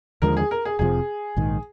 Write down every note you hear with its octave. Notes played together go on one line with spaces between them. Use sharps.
D#2 D3 F3 G#3 A#4
G#4
A#4
G#4
F1 F2 C3 F3 G#4
A#1 G#2 D#3